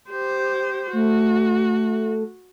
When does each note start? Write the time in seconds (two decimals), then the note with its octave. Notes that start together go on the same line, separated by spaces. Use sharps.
0.10 G4 C5
0.93 A3 F#4